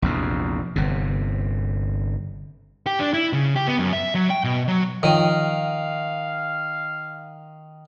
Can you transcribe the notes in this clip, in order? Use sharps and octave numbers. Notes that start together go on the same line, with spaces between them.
A#1 E2 C3
G1 C3
G4
D4
E4
C#3
G4
B3
F#2
E5
F#3
G5
B2
F#3
D#3 F3 F4 F5 G5